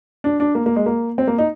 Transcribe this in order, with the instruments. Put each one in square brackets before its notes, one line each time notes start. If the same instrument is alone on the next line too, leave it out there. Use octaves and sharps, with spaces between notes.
[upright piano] D4
D4
A#3
A#3
G#3
A#3
C4
A#3
D#4